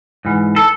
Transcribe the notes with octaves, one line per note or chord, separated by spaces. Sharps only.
G#2 E3
A4